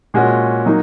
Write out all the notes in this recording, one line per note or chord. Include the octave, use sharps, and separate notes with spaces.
A#2 G#3 C#4 F#4
F#3 A#3 D#4 F#4